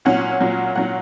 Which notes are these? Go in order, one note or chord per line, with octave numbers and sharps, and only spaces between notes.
A#2 F#3 C#4 F#5
A#2 F#3 C#4
A#2 F#3 C#4 F#5